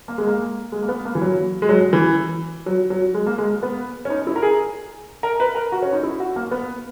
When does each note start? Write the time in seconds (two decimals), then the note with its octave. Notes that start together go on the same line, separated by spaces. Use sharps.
0.08 A#3
0.18 G#3
0.27 A#3
0.72 G#3
0.83 A#3
0.89 B3
1.05 A#3
1.15 E3
1.21 F#3
1.62 G#3
1.69 F#3
1.93 E3
2.66 F#3
2.90 F#3
3.14 G#3
3.27 A#3
3.38 G#3
3.50 A#3
3.63 B3
4.05 C#4
4.10 D#4
4.27 E4
4.36 A#4
4.42 G#4
5.23 A#4
5.40 B4
5.55 A#4
5.72 F#4
5.82 C#4
5.93 D#4
6.03 E4
6.20 F#4
6.36 A#3
6.51 B3